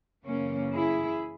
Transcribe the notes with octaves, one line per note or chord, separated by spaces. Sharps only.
F#2 C#3 E3 A#3 C#4
E4 G#4